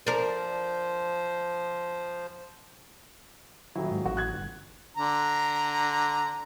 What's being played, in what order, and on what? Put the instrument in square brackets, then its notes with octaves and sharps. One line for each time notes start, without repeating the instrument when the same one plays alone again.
[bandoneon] F3 C5 [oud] D4 A#4
[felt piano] D#1 F#3 [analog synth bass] E4
[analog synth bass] G#2
[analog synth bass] A1 [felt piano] F#4
[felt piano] F#6 G#6
[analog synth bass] G1
[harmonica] D3 A#5